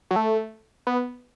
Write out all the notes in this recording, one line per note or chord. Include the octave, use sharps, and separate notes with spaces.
F#3
A3
B3